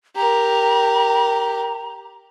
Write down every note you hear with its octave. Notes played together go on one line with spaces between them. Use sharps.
G4 A#4 A#5